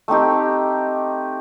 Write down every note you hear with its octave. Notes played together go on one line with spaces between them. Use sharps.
A3 C4 D#4 G4